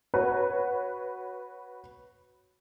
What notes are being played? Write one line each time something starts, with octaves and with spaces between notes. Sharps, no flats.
F#4 B4 C#5